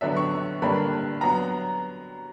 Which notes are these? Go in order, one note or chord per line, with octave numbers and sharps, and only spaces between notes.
D3 F#3 B3 D4 E5
C#6
G2 D3 A#3 D4 B5
F#3 B3 A#5